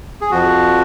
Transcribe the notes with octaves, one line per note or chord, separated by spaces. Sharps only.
G#4
F2 F3 F#4